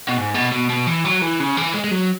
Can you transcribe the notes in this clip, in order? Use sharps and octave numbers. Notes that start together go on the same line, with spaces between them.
B2
G#2
B2
B2
B2
E3
F#3
E3
C#3
E3
G#3
G#3
F#3